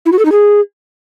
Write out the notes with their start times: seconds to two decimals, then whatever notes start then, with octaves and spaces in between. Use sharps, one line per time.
0.06 E4
0.12 F#4
0.19 A4
0.25 D#4
0.32 G#4